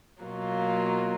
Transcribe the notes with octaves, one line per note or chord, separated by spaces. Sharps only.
B2 F#3 A#3 F4